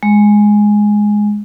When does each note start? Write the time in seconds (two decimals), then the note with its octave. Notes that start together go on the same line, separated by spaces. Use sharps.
0.03 G#3